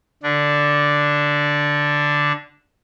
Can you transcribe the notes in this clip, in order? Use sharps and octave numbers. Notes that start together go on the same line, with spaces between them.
D3 D4